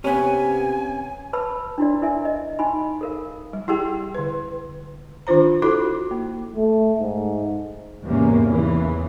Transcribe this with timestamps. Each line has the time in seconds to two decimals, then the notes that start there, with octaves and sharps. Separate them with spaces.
0.04 C3 B3 C#4 G#5
1.33 B4 A5 B5 E6
1.78 D4 E4 F#4 D5
2.02 E4 A#4 E5 G#5
2.25 D#5
2.59 D#4 F#4 G#5 B5
3.01 A4 A#4 F5
3.53 G3
3.68 E4 G4 G#4 G5
4.15 D3 B4
5.27 D#3 D4 F4 C5 A#5
5.62 E4 F#4 A4 B5 D6
6.11 A#3
6.56 A3
7.00 G#2
8.04 E2 G#2 C3 A#3 C#4
8.51 E2 C#3 E3